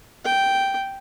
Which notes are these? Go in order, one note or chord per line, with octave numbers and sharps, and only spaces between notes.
G5